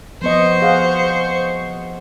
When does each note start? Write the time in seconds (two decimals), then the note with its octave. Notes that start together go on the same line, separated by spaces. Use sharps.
0.22 F3 B3 C5 D#5 C#6
0.62 G#4 F5 F#5